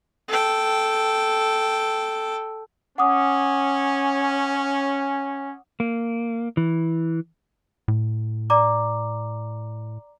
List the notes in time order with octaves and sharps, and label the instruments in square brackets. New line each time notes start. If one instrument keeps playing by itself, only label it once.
[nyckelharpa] A4 G5
[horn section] C#4 [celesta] F#5 D6 D#6
[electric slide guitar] A#3
E3
[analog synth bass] A2
[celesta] D5 A#5 D6